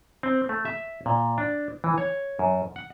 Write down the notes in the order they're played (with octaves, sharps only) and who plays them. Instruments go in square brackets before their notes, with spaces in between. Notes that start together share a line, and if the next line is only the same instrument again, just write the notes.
[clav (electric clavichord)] C4
A3
E5
A#2
D4
E3
C#5
F#2
F#5